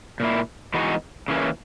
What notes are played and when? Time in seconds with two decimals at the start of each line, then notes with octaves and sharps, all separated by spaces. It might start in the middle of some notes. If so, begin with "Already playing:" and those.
0.20 A#2 A#3 E4
0.74 E3 G#3 B3 D#4 F#4
1.28 C#3 E3 A#3 C#4